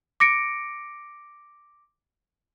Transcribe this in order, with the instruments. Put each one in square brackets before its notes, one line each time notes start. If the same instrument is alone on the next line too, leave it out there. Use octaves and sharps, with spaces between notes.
[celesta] D6 A#6 C#7 D7